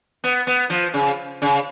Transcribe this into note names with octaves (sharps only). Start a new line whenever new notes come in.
B3
B3
F3
C#3
C#3